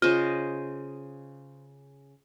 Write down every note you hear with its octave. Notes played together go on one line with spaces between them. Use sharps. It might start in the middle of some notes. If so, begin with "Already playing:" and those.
C#3 F4 C5 D#5